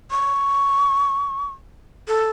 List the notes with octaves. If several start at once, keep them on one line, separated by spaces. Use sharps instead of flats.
C#6
A4